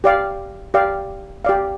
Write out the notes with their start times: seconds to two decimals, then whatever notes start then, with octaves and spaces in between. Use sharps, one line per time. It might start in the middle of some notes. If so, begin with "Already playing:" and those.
0.04 G4 D5 F5
0.74 G4 D5 F5
1.45 G4 D5 F5